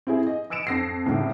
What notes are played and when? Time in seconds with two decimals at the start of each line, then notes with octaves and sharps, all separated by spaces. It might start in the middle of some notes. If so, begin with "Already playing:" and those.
0.07 C4 E4 G#4
0.27 D#5
0.50 D#6 E6 C#7 D7 E7
0.67 F2 A#6 C7
1.06 C2 A2 C#3